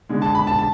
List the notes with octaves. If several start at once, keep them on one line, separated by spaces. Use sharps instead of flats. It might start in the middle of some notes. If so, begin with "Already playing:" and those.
D3 G#3
A5
B5
A5
A5